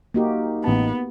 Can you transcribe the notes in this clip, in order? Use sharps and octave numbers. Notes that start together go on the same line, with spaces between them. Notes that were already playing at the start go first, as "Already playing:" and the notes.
A#3 D#4 F#4 G4
A1 B3 A5